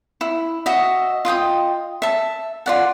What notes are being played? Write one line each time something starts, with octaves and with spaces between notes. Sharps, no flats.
E4
F#4 D#5 E5
F4 D#5 G5 D#6
E5 A5
F4 D5 F#5